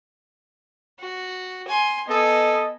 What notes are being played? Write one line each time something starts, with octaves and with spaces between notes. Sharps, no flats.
F#4
G#5 C6
B3 A4 D#5 G#5